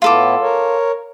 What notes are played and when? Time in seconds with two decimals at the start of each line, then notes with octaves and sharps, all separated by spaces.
0.02 A2 B3 E4 F4 A4 D6
0.42 A#4 C#5